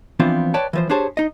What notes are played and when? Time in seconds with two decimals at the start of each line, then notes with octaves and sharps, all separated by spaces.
0.20 E3 F3 B3 C4 D4 F4
0.54 B4 C#5 D5 G5 A5
0.73 E3 F3 C5
0.90 D4 G4 G#4 C5 C#5 A5
1.17 D#4 D#5